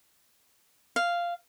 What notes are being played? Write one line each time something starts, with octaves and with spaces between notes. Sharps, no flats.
F5